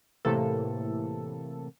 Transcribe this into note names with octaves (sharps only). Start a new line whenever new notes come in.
A2 C3 E3 A#3 A4